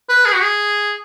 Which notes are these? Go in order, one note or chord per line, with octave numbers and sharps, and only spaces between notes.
B4
G#4
F#4
G#4